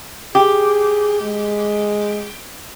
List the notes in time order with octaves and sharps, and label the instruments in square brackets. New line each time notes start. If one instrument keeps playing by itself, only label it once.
[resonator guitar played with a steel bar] G4 [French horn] G#4
[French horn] G#3